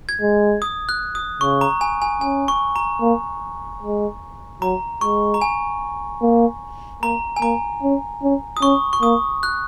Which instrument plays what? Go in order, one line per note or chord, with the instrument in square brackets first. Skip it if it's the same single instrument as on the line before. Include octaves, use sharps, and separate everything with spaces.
[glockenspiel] G#6
[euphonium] G#3
[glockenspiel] D#6
F#6
D#6
[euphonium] C#3 [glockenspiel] C#6
[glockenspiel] A#5
G#5
G#5
[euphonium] C#4 [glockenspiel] G#5
[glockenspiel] C#6
A#5
[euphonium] A#3
G#3
[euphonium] F#3 [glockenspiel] A#5
[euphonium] G#3 [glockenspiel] C#6
[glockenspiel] A#5
G#5
[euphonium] A#3
[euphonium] A#3 [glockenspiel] A#5
[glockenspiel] G#5
[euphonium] A#3 [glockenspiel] A#5
[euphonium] C#4
C#4
[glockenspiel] D#6
[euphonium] C#4 [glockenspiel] C#6
[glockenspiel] C#6
[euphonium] A#3 [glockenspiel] D#6
[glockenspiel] F#6